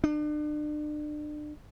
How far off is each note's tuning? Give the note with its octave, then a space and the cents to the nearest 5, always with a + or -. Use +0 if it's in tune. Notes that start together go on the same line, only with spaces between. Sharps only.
D4 +35